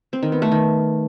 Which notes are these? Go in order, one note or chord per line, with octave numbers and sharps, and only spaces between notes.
C4
D#3
B3
A3
D#3